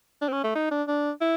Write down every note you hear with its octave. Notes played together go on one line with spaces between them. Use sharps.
D4
C4
C#4
A3
D#4
D4
D4
E4